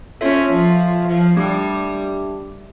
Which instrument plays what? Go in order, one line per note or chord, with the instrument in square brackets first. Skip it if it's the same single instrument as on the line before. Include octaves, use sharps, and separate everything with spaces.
[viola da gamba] C#4 [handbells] F4 A4 C#5 E5
[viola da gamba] F3
F3
[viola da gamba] G3 [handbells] A3 D4 G4